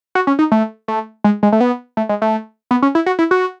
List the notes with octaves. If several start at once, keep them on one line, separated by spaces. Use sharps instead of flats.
F#4
C#4
D#4
A3
A3
G#3
G#3
A3
B3
A3
G#3
A3
B3
C#4
E4
F#4
E4
F#4